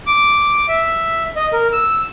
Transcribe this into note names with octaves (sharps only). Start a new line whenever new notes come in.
D6
E5
D#5
A#4
E6